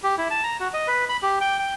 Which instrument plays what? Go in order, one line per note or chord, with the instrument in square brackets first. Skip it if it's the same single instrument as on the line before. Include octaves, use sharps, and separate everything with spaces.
[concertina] G4
E4
A5
A#5
F#4
D#5
B4
B5
G4
G5
G5